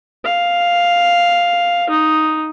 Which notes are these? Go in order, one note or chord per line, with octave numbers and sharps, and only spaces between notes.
F5
D#4